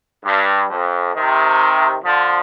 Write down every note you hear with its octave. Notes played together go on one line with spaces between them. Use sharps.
G2
F2
C3 D#3
D3 F3